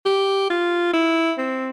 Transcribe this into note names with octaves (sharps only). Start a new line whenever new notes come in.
G4
F4
E4
C4